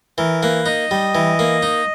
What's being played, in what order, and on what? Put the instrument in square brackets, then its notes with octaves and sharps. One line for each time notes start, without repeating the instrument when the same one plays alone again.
[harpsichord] E3 [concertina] A#4
[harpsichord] A#3 [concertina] B4
[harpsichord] D#4 [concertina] D#5
[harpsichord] G3
E3
A#3
D#4